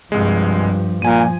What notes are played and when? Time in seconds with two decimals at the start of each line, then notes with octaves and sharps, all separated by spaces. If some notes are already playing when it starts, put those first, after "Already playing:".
0.12 C2 G2 F3 G#3
1.02 A#2 F3 G#5 D#7